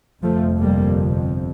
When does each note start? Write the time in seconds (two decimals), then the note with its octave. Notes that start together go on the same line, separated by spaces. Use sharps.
0.23 G1 F2 C3 F3 A3
0.61 G3 A#3